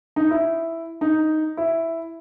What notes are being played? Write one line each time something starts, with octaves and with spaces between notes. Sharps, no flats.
D#4
E4
D#4
E4